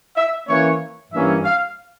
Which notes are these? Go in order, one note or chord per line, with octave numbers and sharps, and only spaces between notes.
E5
E3 A#3 C#4 C#5
G2 E3 A#3 C#4 E5
F5